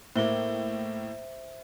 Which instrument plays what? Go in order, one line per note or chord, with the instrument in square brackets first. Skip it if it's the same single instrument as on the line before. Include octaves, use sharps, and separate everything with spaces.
[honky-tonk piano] A2 A#3 [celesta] C5 E5 G7